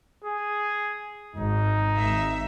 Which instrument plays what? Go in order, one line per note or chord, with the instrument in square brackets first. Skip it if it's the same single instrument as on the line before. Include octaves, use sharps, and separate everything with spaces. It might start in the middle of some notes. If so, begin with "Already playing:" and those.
[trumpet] G#4
[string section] G#1 [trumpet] D#4
[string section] G#1 E5